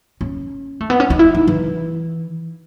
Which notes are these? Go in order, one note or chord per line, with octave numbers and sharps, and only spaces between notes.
C#4
A3
B3
C#4
D#4
E4
D#4
E3